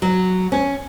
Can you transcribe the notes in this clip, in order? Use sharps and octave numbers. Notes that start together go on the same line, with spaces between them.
F#3
C#4